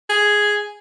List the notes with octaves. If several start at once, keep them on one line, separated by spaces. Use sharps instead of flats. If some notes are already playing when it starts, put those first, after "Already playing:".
G#4